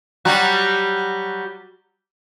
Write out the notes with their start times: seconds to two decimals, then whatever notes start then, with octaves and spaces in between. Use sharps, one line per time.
0.25 F#3 G3 F#4